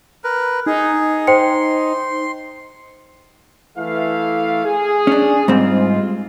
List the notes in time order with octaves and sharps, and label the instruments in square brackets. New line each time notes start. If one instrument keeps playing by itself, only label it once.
[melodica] A#4 B4
[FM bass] D#4 [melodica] G#4
[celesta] C5 G5 C#7 [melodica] C6
[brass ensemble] E3 A3 F5
G#4
[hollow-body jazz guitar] C#4 D4
[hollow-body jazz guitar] G#2 G3 C4 [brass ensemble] G#3 F4